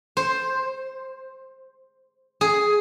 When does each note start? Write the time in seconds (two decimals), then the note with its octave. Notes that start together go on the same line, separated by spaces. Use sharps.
0.17 C5
2.41 G#4